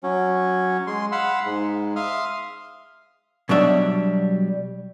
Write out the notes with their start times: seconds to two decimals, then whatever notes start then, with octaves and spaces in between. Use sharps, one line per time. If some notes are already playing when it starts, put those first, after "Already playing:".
0.03 F#3 C#4
0.87 G#3 C6
1.12 F5 F#5 B5 C6 E6
1.46 G#2 G#3
1.96 E5 F5 C6 D#6 F6
3.49 B2 F#3 G3 D4 E5